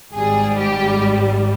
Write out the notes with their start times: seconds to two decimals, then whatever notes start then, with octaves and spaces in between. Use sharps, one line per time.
0.13 G#1 G#2 G3 G#4
0.57 G4